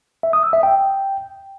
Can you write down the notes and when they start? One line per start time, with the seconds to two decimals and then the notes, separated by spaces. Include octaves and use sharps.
0.23 E5
0.33 D#6
0.43 E6
0.53 E5
0.63 G5